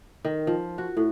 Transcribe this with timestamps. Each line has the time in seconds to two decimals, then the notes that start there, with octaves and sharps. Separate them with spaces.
0.25 D#3
0.47 F3
0.78 F#4
0.97 A2